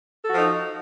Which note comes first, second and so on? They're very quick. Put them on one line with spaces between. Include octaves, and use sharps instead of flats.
A4 F#4 F3 D#4